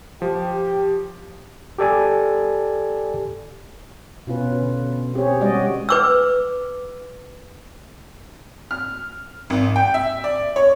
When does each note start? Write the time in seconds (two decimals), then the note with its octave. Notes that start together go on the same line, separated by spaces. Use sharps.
0.22 F3 G4
1.78 G4 A4 D5 G#5
4.27 B2 C#4 F4 B4
4.62 D3
5.14 C4 G4 G#4 C#5
5.40 G3 G#3 C#4 F#4 D5 D#5
5.89 B4 D6 E6
8.71 F6
9.50 G#1
9.76 G5
9.94 E5
10.24 D5
10.56 C#5